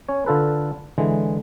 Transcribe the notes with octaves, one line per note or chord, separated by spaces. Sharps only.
C#4 C#5
D3 F4 A4 B4
D3 E3 G#3